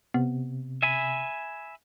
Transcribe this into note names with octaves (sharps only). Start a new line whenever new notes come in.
C3 B3
E5 G#5 B5